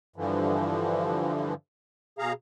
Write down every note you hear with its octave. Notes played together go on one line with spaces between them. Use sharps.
G2 D3 E3 F3
B2 G#4 F5 A#5